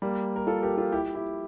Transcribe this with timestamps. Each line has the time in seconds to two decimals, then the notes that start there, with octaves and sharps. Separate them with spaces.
0.02 G3 A#3
0.36 A#4
0.47 F4 A4
0.63 G4 A#4
0.77 F4 A4
0.92 E4 G4
1.15 E4 G4